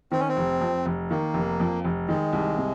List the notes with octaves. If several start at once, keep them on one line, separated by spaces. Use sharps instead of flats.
D#3 C4
C#4
C4
F1
F2
F1
D#3 A#3
F1
F2
F1
D#3 G#3
C2
C3